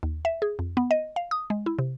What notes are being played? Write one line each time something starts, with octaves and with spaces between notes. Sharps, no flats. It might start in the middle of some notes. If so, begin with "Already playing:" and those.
D#2
E5
G#4
F2
B3
D#5
F5
D#6
G#3
E4
C3